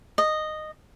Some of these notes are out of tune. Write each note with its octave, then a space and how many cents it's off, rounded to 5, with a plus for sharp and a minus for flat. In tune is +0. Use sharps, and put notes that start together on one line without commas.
D#5 -10